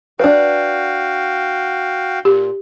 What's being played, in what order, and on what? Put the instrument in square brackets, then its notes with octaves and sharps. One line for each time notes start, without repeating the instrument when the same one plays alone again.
[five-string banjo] D4 B4 [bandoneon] F#4 F5 G5
[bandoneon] A#2 [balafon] G4